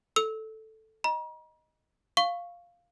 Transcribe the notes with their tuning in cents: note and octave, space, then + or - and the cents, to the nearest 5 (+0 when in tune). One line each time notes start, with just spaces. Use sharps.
A4 +0 E6 -25
D#5 +0 A#5 +40
F5 +0 C#6 +0